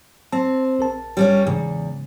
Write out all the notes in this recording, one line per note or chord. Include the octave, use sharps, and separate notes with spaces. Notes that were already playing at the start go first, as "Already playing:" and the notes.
C4 A5
A#1 A#4 A5
G3 C#4 C#5
E2 G#2 C#3